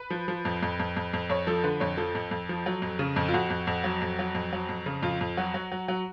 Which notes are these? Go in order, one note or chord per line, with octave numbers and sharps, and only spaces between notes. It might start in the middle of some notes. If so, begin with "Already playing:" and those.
Already playing: B4
F3
F3
F2
F2
F2
F2
F2
F2 C#5
F3 A4
D3 B4
F2 C#5
F3 A4
F2
F2
F3
F#3
F2
C#3
F2
F4
F2 F#4
F2
F2
F#3
F2
F#3
F2
F#3
F2
C#3
F2 F4
F2
F#3 F#4
F#3
F#3
F#3